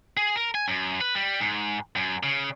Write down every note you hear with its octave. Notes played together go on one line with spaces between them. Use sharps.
G#4
A#4
G#5
F#2
B4
G3
G#2
F#2
C#3